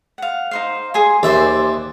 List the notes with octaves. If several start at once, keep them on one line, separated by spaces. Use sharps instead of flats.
F5 F#5
D#4 C5 F5
G#4 G#5 C6
D#2 C5 D5 E5